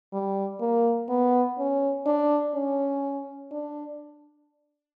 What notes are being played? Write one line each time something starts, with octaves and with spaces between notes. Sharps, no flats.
G3
A#3
B3
C#4
D4
C#4
D4